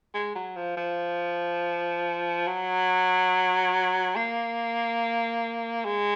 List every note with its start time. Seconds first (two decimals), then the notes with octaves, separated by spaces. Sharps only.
0.14 G#3
0.35 F#3
0.56 F3
0.77 F3
2.47 F#3
4.16 A#3
5.85 G#3